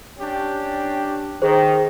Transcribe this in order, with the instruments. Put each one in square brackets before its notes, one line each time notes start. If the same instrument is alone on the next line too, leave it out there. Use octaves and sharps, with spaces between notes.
[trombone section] C#4 D4 G4
[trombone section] D#3 [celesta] G#4 C5